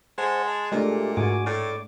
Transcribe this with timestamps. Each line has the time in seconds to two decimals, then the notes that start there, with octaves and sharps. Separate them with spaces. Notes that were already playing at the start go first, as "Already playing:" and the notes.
0.18 G#3 C5 F#5 A5
0.48 A5
0.72 A#2 G#3 A3 D4 G4
1.17 G#2 F#4 G#5 D6
1.46 A2 D5 D6